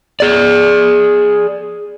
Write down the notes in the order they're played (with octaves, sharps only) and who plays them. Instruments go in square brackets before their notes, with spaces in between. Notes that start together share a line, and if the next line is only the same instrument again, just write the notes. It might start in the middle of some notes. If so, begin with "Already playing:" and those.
[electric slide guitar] G#4 D5